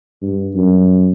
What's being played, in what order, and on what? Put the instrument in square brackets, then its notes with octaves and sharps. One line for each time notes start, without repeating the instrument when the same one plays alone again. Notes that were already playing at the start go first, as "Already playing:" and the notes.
[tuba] G2
F#2